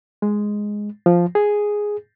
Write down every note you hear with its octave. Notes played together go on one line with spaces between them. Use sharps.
G#3
F3
G#4